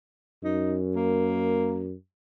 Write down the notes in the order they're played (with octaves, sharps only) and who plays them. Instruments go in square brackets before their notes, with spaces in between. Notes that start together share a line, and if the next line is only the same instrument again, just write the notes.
[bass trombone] F#2 [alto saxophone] D#4
[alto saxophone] A#3